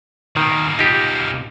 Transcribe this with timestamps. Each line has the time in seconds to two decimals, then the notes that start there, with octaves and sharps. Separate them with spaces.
0.36 B2 D#3 A#3
0.79 D#4 F4 G4